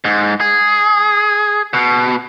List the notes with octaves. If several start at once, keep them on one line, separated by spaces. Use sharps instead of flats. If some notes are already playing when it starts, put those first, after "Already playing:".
G#2
G#4
B2